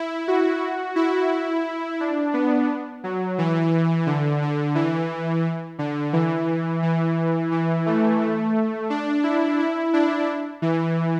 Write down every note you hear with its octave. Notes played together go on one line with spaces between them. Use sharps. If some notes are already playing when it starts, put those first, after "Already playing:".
Already playing: E4
F#4
E4
D4
B3
F#3
E3
D3
D3
E3
D3
E3
E3
E3
A3
A3
D4
E4
E4
D4
E3